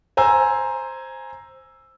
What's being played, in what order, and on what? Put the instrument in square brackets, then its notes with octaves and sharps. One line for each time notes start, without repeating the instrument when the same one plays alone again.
[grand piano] C5 G#5 A#5 E6